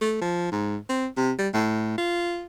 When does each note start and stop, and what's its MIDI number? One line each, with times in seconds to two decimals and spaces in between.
0.01 0.17 57
0.21 0.51 53
0.52 0.76 44
0.89 1.06 60
1.17 1.32 48
1.38 1.49 55
1.54 1.94 45
1.98 2.46 65